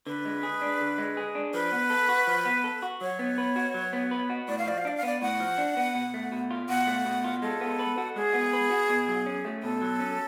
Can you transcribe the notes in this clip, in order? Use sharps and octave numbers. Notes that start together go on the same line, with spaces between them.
D3 B4
G#3
G#4
D4
D3
G#3
G#4
D4
F3 B4
B3
A4
F#4
F3
B3
A4
F#4
F#3 C#5
B3
B4
F#4
F#3
B3
B4
F#4
A2 D5
F5
F3 D5
F5
D4 D5
F5
B3 D5
A2 F#5
F3
D4
B3
B2
A3
B2
F4
B2 F#5
A3
B2
F4
G#3 A4
B3
B4
F#4
G#3 G#4
B3
B4
F#4
B2
F#3
C#4
A3
B2 A4
F#3
C#4